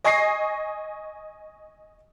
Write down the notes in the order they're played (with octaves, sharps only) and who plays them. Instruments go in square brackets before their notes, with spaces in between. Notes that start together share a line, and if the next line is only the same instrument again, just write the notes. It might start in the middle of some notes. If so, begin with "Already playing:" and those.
[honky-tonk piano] D#5 G#5 C#6 D#6 A#6 C7